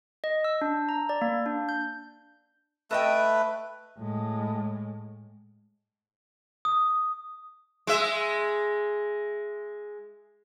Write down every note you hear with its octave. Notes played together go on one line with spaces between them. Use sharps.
D#5
E6
D4
A#5
D5
A#3
D4
G6
A3 A4 B4 D#5 G5
A2 G#3
D#6
G#3 E5